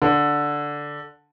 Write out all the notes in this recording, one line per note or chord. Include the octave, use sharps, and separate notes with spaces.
D3